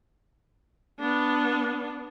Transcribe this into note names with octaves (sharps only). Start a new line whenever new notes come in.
B3 D4